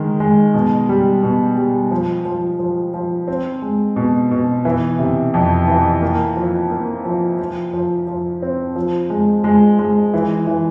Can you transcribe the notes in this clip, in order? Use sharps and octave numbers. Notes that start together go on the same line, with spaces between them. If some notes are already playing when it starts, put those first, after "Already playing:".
Already playing: D#3 G#3
G#3
B2
G3
B2
G3
F3
F3
F3
F3
C4
G#3
B2
B2
E3
C3
F2
E3
A#3
F3
A#3
F3
F3
F3
F3
C4
F3
G#3
G#3
G#3
E3
E3